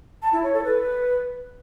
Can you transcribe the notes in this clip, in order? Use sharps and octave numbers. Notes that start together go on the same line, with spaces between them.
A5
E4
C#5
A4
B4